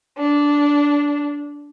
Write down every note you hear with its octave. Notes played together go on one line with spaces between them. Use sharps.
D4